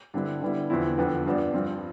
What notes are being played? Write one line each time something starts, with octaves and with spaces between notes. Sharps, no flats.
G2 D3 G3 C4 E4
D3 G3 B3 E4
E2 D3 F3 C4 E4
F2 D3 F3 B3
G2 F3 B3 D4
G2 F3 C4